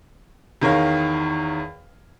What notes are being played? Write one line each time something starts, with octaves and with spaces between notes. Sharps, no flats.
E2 D#3 A#4 C#5 F5